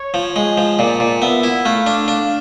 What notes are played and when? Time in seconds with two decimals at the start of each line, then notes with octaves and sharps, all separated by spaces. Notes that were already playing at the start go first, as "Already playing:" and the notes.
Already playing: C#5
0.14 F3
0.36 G#3
0.58 F3
0.79 A#2 D5
1.00 A#2
1.22 B3 E5
1.43 E4
1.64 A3 F5
1.87 D4
2.08 D4